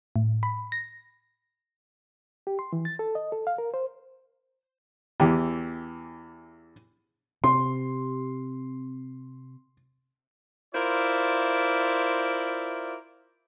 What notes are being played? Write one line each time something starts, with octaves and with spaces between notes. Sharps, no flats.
A2
B5
A#6
G4
C6
E3
A6
A4
D#5
A4
F5
A#4
C5
E2 E3 G4
C3 C6
E4 F4 A#4 C5 D5 E5